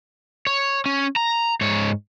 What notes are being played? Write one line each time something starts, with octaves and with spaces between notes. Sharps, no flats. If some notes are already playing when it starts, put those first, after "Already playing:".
C#5
C#4
A#5
G#2 C#5